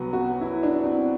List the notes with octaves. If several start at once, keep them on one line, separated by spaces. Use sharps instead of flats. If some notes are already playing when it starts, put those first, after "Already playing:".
Already playing: C2 C3 F#3 B3 F#4
F#4
E4
D4
C4